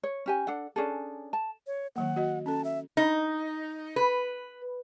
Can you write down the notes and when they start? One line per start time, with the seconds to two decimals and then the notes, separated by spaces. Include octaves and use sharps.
0.03 C#5
0.26 C#4 G4 G#5
0.47 D4 A4 F#5
0.76 C#4 D4 G#4 A4
1.33 A5
1.67 C#5
1.96 D#3 F#3 A#3 F#5
2.16 F#4 D#5
2.46 C#4 A4 A5
2.64 E5
2.97 D#4
3.96 B4